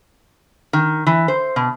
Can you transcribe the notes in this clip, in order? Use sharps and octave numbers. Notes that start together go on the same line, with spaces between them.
D#3
E3
C5
B2